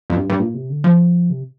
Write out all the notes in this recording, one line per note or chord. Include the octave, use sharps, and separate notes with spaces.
F2
G2
G2
A#2
C3
D3
F3
C3